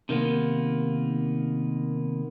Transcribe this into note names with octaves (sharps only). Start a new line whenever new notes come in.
C3 D#3 A#3 B3